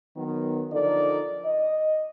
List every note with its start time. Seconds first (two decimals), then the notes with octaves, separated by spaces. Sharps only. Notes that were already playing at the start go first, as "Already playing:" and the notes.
0.16 D#3 F#3 B3
0.72 D3 F3 D#4 A4 A#4 D5
1.45 D#5